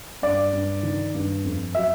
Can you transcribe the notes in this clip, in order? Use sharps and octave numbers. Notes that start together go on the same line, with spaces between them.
G2 D5
G2
D#3
G2
F2
F#3 E5